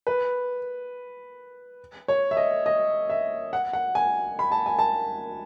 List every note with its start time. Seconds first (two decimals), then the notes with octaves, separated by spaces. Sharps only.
0.07 B4
2.08 C#5
2.31 E5
2.37 D#5
2.66 D#5
3.10 E5
3.53 F#5
3.73 F#5
3.95 G#5
4.39 B5
4.52 A5
4.66 G#5
4.79 A5